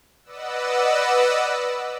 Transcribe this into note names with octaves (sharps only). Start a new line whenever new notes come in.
B4 D5 D#5 F#5 E6